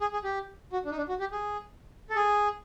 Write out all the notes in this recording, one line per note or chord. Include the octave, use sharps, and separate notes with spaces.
G#4
G#4
G4
F#4
D4
D#4
D4
F#4
G4
G#4
A4
G#4